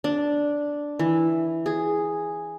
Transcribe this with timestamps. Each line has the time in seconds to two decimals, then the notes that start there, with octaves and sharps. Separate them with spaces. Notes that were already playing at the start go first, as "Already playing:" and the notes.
0.04 D4
0.99 E3
1.66 G#4